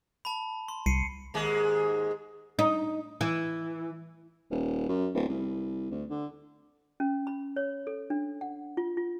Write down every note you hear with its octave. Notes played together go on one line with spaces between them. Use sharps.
A5 B5
C6
C2 C7 C#7 D#7
D#2 G#2 G#3
D#4
E3
D#1
F#2
D1
C2
D2
D3
C#4
B5
C#5
A4
D4
F#5
F4
F4